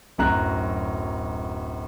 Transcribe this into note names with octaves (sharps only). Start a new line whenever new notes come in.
D1 F#2 A#5 F#6